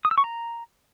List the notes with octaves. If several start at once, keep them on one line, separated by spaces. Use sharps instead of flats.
D#6
E6
C#6
A#5